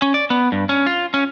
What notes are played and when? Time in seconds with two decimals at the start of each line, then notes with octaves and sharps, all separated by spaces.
0.02 C#4
0.14 D5
0.30 B3
0.52 G2
0.69 C#4
0.86 F4
1.14 C#4